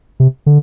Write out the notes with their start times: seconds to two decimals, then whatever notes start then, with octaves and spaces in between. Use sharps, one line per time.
0.20 C3
0.46 D3